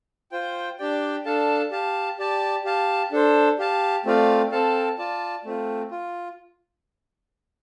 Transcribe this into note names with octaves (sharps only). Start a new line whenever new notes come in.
F4 C5 G5
D4 G4 D5 G5
D4 A4 F5 A5
G4 F5 A5
G4 D5 A5
G4 F5 A5
D4 A4 C5
G4 F5 A5
A3 C4 F4 D5 F5
C4 A4 F5 A5
F4 D5 A5
A3 C4 F4
F4